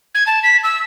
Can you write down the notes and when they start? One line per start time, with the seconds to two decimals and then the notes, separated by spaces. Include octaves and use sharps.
0.15 G#6
0.27 A5
0.44 B6
0.64 E6